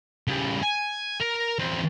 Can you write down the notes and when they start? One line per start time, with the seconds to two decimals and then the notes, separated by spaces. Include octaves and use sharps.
0.27 C#3 G3
0.63 G#5
1.21 A#4
1.59 E2 C4